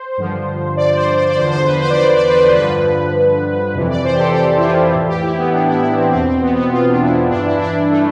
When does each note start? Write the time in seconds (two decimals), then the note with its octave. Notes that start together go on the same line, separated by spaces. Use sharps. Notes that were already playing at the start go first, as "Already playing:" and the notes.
Already playing: C5
0.18 G2 D3 F3
0.77 D5
0.97 C5
1.17 C5
1.29 D5
1.37 E2 D3 F3 C5
1.51 C5
1.66 B4
1.81 C5
1.90 D5
1.96 C5
2.16 D5
2.29 B4
2.36 C5
2.56 G2 D3 F3 B4
3.75 F2 C3 E3
3.89 D5
4.04 C5
4.15 G4
4.19 A4
4.34 G4
4.58 E4
4.64 F4
4.94 A2 E3
5.08 G4
5.23 E4
5.38 B3
5.53 D4
5.68 E4
5.82 E4
5.97 C4
6.12 E2 B2 C4
6.27 C4
6.42 B3
6.56 B3
6.72 F4
6.90 D4
7.02 E4
7.31 G2 E3 D4
7.46 E4
7.61 D4
7.91 A3